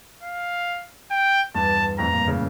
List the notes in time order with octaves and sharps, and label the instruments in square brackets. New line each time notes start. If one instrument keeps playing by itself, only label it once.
[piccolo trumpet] F5
G5
[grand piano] E2 G2 [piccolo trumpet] A5
[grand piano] F2 A2 [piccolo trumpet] A#5
[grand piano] G2 A#2
A2 C#3